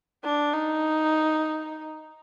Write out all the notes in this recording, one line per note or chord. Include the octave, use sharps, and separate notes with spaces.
D4
D#4